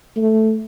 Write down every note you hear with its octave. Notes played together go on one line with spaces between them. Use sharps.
A3